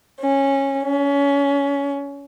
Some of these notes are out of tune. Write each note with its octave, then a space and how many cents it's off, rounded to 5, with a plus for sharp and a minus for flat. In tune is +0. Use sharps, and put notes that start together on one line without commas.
C#4 -15
C#4 +25